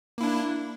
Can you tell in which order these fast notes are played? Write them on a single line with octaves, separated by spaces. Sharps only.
A#3 E4 D4